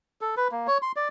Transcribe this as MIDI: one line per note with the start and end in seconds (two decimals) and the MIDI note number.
0.21 0.35 69
0.37 0.48 71
0.52 0.67 58
0.68 0.78 73
0.82 0.92 84
0.96 1.08 74